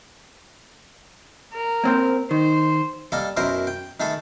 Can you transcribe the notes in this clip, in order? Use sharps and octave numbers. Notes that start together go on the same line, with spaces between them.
A#4
A#3 C4 C5
D#3 C5
G3 A#3 A4 D#5
F#2 B2 E4 A#4 C5 D#6
G5
D#3 A3 G#4 A4 B5